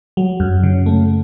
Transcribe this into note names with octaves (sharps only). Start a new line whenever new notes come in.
F#3
F#2
C#3
A3